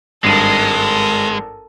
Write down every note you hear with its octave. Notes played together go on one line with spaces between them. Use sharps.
G#1 G2 G#3 A4 A#4 D#7